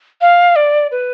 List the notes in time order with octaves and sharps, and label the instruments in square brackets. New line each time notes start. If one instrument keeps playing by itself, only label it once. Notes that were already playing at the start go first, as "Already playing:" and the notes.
[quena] F5
D5
B4